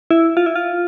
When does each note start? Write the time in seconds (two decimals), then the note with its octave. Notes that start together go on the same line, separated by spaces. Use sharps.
0.11 E4
0.37 F4
0.46 E4
0.56 F4